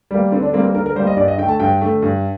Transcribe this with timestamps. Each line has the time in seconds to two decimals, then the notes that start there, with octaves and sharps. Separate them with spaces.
0.11 G3 A#3
0.32 D3 C4
0.42 D4
0.53 G3 A#3 C4
0.64 A#4
0.75 D3 A#4
0.86 A#4
0.95 G3 C5
1.00 A#3
1.07 D#5
1.17 G2 D5
1.28 D#5
1.38 D3 G5
1.43 A3
1.49 A5
1.60 G2 G5
1.81 D3 A3
2.02 G2